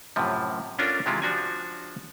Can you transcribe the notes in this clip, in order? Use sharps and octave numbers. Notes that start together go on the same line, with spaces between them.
F#2 A2 C3 F3
C#4 D4 F4 A4 A#4
C3 D#3 G#3 E4 F4
F3 D4 F#4 G4 G#5